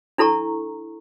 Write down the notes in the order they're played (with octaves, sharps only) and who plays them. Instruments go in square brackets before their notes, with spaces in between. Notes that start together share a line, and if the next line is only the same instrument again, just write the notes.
[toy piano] D4 E4 A4 A#5 C#6